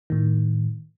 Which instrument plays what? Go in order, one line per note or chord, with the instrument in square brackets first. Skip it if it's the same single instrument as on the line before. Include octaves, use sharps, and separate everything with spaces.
[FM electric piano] A2 D#3